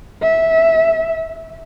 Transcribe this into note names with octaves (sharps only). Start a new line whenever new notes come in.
E5